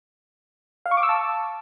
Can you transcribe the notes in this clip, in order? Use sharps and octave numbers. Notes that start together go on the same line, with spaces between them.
F5
C#6
D6
E6
A5